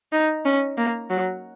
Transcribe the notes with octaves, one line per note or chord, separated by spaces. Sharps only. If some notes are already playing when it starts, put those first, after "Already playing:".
D#4
C#4
A#3
F#3